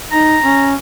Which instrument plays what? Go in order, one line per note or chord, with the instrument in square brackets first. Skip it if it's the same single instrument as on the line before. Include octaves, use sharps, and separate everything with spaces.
[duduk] D#4 [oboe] A#5
[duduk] C#4